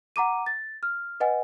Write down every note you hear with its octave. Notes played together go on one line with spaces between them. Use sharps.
F#5 A#5 D6 D#7
A6
F6
B4 D#5 F#5 G#5